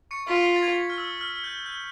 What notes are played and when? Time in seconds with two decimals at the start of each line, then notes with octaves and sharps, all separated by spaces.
0.11 C#6 C#7
0.28 F4 B6
0.56 A6
0.62 G#6
0.90 F6
0.98 E6
1.21 F6
1.44 G6
1.66 G6